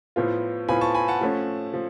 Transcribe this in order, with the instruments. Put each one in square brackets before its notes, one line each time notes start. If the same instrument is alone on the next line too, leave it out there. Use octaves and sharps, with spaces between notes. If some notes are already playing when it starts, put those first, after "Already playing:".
[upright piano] A2 F3 B3 F4
[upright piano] A2 F3 B3 F4 [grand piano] G#5 B5
[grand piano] A5 C#6
G#5 B5
F#5 A5
[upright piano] F3 A3 C#4
F3